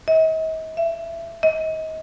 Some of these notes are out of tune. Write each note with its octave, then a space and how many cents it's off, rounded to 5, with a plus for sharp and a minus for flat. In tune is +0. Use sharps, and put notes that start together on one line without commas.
D#5 +45
E5 +20
D#5 +30